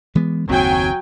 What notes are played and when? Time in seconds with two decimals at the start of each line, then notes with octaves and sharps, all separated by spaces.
0.15 E3 G#3 B3
0.48 F#1 D#2 F#3 C4 G5 G#5